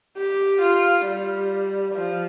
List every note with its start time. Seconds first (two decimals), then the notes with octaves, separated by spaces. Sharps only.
0.17 G4
0.62 F4
1.06 G3
1.95 F3